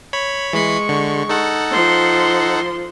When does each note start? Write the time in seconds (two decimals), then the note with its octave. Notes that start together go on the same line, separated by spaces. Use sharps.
0.13 C#5 B5
0.53 E3 G#3 B5 C#6 C7
0.89 D3
1.29 D#4 A4 F#5
1.71 F3 C6